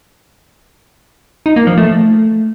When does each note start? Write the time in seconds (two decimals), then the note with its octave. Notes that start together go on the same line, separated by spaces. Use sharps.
1.46 D#4
1.56 A#3
1.67 F3
1.78 A3